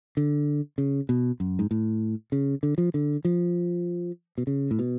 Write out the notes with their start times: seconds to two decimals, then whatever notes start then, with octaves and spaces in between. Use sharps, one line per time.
0.17 D3
0.78 C#3
1.09 B2
1.40 F#2
1.59 G#2
1.71 A2
2.32 C#3
2.63 D3
2.78 F3
2.94 D3
3.25 F3
4.38 B2
4.47 C#3
4.71 A2
4.79 B2